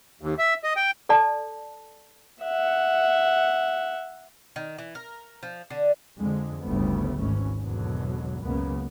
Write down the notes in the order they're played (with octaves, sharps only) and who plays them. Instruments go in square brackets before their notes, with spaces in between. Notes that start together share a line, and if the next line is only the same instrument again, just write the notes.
[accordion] D#2
E5
D#5
G5
[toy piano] A4 D5 A5
[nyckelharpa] E5 F#5
[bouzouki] D#3
E3
A#4
F3
D3
[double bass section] F2 D3 G#3
G1 D2 C#3 G3 A3 B3
G#1 D2 G#2 E3 C#4
G#1 E2 B2 D3 F#3
C#2 F#2 C#3 A#3 B3